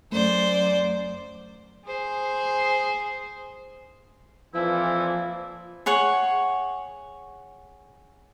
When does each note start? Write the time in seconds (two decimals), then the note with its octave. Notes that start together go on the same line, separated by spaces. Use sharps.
0.12 F#2 A3 C5 D5
1.85 G#4 C5
4.54 F2 A#2 E3 F3 E4
5.86 G#4 C#5 F#5 C#6